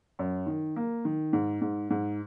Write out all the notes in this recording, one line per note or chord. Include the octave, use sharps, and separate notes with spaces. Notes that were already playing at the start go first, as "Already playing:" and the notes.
F#2
D#3
A#3
D#3
G#2
G#2
G#2